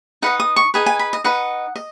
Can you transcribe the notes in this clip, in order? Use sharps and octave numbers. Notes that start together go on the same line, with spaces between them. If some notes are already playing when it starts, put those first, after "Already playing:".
D#4 B4 D#5 F#5
D#6
C#6
D#4 G#4 B4
G#5
B5
D#5
D#4 B4 D#5 F#5
D#5